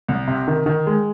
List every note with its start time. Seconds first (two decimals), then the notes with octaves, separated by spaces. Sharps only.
0.08 C2
0.28 C3
0.48 D#3
0.66 D#3
0.87 G#3